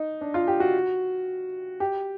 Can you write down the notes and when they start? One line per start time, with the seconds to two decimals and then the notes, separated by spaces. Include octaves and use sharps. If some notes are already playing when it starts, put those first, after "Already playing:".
Already playing: D#4
0.21 D4
0.34 F4
0.47 G4
0.60 F#4
1.80 G4